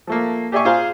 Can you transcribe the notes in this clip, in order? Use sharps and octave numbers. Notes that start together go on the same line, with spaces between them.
F3 A3 A#3
G4 G#4 D5 E5 G#5 C#6
F4 G#4 C5 F5 A#5